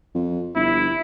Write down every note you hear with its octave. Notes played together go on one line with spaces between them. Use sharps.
F2
G1 E4